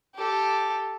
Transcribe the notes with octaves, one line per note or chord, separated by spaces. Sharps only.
G4 A4